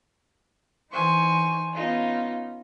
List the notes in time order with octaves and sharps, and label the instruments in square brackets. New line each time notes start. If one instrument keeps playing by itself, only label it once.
[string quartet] E3 D#4 C5 G#5 C#6
B3 C#4 D#4 F4